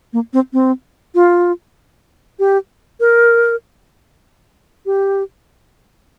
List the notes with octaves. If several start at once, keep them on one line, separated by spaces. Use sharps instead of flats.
A#3
C4
C4
F4
G4
A#4
G4